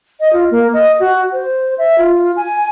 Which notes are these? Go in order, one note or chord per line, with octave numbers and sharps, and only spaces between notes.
D#5
F4
A#3
D#5
F#4
C5
E5
F4
G#5